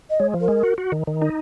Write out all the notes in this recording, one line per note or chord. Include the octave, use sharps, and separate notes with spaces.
D#5
G#3 C#5
F3
A#4
G#3
F#4
F#4
D#3
D#3
D#4